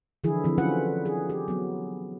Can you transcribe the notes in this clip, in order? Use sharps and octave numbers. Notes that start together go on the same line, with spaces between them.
D3 E3 F3 E4 G#4
D3 E3 F3 C4
D3 F#3 C#4 F4 B4 F#5
G#4
G4
F#3 B3